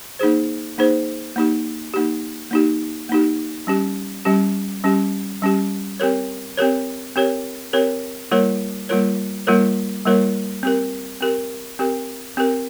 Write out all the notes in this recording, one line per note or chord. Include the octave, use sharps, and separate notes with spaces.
A#3 D#4 G#4 C5
A#3 D#4 G#4 C5
A#3 D#4 G4
A#3 D#4 G4
A#3 D#4 G4
A#3 D#4 G4
G3 C#4 G4
G3 C#4 G4
G3 C#4 G4
G3 C#4 G4
C4 G4 A#4 C#5
C4 G4 A#4 C#5
C4 G4 A#4 C#5
C4 G4 A#4 C#5
G3 A#3 F4 A#4 C#5
G3 A#3 F4 A#4 C#5
G3 A#3 F4 A#4 C#5
G3 A#3 F4 A#4 C#5
C4 G4 A#4
C4 G4 A#4
C4 G4 A#4
C4 G4 A#4